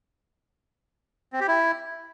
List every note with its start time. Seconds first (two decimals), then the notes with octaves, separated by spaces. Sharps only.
1.33 C4
1.40 G4
1.48 E4